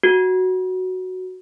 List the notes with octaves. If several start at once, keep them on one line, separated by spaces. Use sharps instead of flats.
F#4